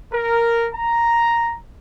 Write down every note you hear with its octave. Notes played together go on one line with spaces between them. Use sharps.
A#4
A#5